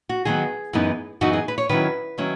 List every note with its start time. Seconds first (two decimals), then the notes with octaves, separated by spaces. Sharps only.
0.09 F#4
0.25 D#3 F#3 B3 G#4
0.73 F#2 E3 B3 D#4
1.21 F#2 E3 B3 D#4 F#4
1.33 G#4
1.48 B4
1.58 C#5
1.69 D#3 F#3 C#4 E4 B4
2.18 D#3 F#3 C#4 E4